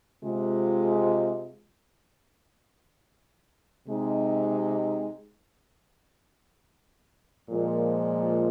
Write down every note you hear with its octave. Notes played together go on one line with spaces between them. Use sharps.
C3 G#3 F4
C3 G#3 D#4
A#2 F3 G#3